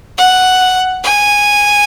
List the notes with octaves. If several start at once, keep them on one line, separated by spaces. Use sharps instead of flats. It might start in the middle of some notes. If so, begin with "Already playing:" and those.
F#5
G#5